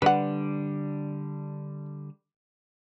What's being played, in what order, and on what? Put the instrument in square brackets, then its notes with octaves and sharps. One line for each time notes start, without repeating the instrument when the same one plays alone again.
[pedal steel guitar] D3 G3 D4 [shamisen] B4 F#5